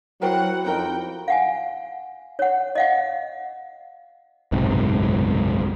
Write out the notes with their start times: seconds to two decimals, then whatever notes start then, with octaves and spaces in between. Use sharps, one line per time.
0.22 F#3 E4 F#4 A#4 C5 F#5 G5
0.66 F2 D#4 F#4 A#4 G5
1.28 F5 F#5 G#5
2.39 C#5 F#5
2.75 D#5 F5 F#5
4.52 F#1 B1 G#2 C3